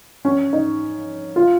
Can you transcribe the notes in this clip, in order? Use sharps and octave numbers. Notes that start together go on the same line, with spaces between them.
C#4
D#4
F4